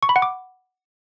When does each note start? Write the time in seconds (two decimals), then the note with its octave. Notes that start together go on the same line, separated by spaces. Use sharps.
0.03 C#6
0.09 B5
0.16 F#5
0.22 D6